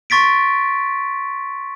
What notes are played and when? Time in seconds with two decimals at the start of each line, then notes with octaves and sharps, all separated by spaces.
0.10 C6 C#6 A6 B6 D7